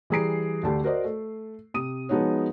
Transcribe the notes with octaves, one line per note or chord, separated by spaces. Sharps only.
E3 G3 G#4 A#5 C7 D7
D2 D3 A3 G4 A5
F#4 A#4 C5 D5 D#5
A3
C3 D#6 D#7
F3 G#3 B3 D#4 F#4 C#5